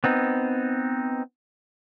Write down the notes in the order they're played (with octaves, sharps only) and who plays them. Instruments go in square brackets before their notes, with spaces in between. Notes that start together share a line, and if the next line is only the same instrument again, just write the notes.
[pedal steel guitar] B3 C4 D#4